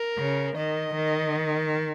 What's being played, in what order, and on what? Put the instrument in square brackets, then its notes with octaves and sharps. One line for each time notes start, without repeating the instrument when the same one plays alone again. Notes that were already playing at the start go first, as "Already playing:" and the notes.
Already playing: [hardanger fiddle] A#4
[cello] C#3
[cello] D#3 [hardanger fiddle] D#5
[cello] D#3